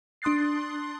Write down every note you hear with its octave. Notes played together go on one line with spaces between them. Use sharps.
D4 C6 D#6 F#6 A6 C7